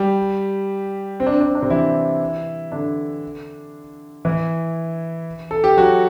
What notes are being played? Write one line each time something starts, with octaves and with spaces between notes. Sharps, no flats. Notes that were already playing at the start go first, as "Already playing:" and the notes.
Already playing: G3 G4
C4
D4
C4
D4
C4
D4
C3 C4
E3 E4
D3 D4
E3 E4
A4
G4
F#3 F#4